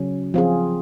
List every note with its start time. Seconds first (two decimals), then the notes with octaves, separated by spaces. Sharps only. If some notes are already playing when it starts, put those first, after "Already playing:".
Already playing: C#3 F#3 C#4
0.34 F3 C4 F4 G#4